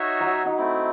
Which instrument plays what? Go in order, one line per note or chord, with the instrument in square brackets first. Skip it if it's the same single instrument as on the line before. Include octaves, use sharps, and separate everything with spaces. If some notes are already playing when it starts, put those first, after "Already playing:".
Already playing: [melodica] D#4 F#4 C#5 E5
[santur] F#3
D#4 F#4
[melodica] A3 C4 E4